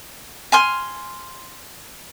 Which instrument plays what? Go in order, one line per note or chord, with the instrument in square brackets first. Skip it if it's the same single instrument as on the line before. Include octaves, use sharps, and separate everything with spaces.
[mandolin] G#5 C6 F6